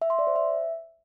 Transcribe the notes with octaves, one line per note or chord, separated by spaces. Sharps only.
E5
C6
D5
C5
E5